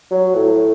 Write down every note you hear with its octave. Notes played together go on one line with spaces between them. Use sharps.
F#3
A2